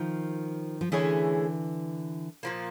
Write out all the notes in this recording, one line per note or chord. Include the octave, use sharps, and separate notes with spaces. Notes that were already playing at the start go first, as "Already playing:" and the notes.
Already playing: D#3 F3
F3
D3 E3 A3 C#4 E4 G#4
A#2 F3 A#3